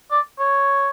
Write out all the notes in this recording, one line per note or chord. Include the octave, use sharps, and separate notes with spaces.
D5
C#5